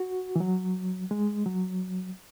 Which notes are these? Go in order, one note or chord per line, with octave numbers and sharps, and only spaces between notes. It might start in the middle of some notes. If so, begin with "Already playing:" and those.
Already playing: F#4
E3
F#3
G#3
F#3